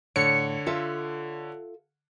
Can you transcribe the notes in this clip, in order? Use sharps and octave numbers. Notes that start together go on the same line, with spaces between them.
A2 D3 C#5 C#7
F4 A4 E5